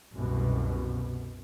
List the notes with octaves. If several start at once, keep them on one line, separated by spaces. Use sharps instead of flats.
C2 F#2 B2